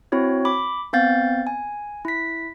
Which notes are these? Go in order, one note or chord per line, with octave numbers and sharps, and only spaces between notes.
C4 E4 F#4 C#5
B5 D6
B3 C4 F5 G6 A6
G#5
E4 B6